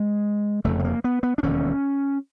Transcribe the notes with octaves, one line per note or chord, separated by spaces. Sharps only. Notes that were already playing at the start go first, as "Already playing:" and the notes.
Already playing: G#3
F1 F2 C#3 A3
A3
A#3
B3
B3
D4
E1 D#2 D3 C#4